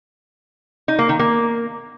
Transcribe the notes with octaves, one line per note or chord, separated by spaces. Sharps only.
D#4
A#3
D#3
A#3